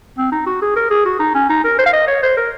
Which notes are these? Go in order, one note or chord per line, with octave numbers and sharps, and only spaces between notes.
C4
D#4
F#4
G#4
A#4
G#4
F#4
D#4
C#4
D#4
A#4
C5
F5
D#5
C#5
C5
A#4